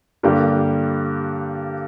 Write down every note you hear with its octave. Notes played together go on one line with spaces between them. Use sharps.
G2 D3 G3 A#3 G4